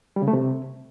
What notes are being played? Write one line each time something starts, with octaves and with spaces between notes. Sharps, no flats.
G3
C#3
A3
C3